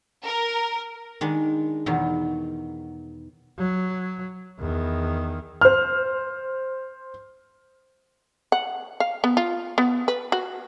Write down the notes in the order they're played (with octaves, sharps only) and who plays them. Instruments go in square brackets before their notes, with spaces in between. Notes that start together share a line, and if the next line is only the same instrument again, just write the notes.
[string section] A#4
[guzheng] D#3 G#3 D4
E2 B2 D#3 F#3
[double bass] F#3
E2 D#3
[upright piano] C5 F6
[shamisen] F#5
F5
B3
F4
B3
B4
F#4